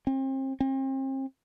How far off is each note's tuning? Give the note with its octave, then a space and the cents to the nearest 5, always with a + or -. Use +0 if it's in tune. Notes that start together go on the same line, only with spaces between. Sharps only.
C4 +35
C4 +40